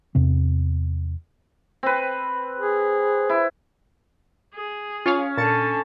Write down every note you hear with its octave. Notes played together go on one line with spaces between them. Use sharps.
E2 C3 C4
C4 B4
G#4
E4
G#4
C#4 F4 C#5 F5
A#2 D3 A5 A6 C#7